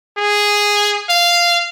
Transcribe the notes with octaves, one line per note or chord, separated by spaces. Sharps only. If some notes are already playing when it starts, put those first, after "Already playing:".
G#4
F5